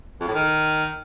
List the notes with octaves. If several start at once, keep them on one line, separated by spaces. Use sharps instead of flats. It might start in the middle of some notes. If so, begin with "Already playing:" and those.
F2
A2
D#3